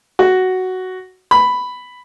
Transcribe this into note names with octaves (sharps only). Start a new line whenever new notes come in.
F#4
B5